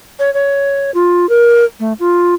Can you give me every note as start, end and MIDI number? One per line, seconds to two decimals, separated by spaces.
0.19 0.33 73
0.34 0.91 73
0.94 1.29 65
1.29 1.65 70
1.80 1.93 57
2.00 2.34 65